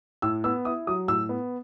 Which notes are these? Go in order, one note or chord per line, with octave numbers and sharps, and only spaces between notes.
A2 E6
B3 E6
E4 D#6
F#3 D#6
A2 E6
B3